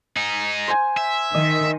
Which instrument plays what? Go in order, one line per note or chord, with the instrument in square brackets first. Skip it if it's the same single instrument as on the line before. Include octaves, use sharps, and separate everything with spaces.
[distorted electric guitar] D#4 G#4
[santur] C5 G#5
[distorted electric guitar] E5
[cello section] D#3 [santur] D#5